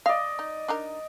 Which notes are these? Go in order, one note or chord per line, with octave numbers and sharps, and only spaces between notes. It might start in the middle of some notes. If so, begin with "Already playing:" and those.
D5 D#5 F5
D#4
D4 D#4 A#4